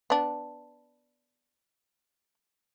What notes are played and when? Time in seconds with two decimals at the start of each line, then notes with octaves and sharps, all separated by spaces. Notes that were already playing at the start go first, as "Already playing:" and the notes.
0.10 B3 D4